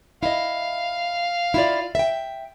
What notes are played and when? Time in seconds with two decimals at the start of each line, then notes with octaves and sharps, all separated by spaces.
0.23 E4 D#5 F5
1.54 E4 F4 D5
1.95 E5 G5